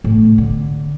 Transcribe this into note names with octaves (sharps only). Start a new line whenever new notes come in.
A2
D3